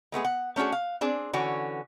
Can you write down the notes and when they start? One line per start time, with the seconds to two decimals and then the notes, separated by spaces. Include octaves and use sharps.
0.12 G#3 A3 B3 G#4
0.25 F#5
0.56 A3 C#4 D4 F#4 G#4
0.72 F5
1.01 C4 D4 G#4
1.33 D3 E3 C#4 F#4